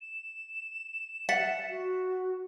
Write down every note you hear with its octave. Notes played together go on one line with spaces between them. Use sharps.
E7
E5 F#5 A6 B6
F#4